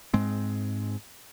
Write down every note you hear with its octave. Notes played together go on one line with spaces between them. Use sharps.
G#2 G#3 C4